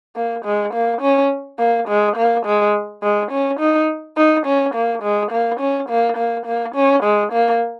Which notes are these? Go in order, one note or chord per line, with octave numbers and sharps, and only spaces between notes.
A#3
G#3
A#3
C#4
A#3
G#3
A#3
G#3
G#3
C#4
D#4
D#4
C#4
A#3
G#3
A#3
C#4
A#3
A#3
A#3
C#4
G#3
A#3